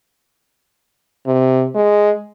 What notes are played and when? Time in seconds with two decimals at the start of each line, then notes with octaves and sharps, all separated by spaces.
1.26 C3
1.75 G#3